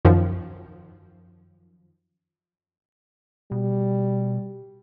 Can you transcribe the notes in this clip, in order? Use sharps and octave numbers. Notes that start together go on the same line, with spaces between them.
F#2 D#3 F3
B2 G3